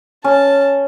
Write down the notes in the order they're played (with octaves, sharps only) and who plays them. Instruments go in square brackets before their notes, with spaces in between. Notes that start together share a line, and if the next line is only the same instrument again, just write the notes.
[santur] C#4 [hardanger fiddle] A5